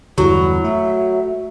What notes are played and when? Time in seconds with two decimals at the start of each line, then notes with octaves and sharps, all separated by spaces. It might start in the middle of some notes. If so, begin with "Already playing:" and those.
0.18 E2 G2 D3 F#3 E4
0.64 A3 E5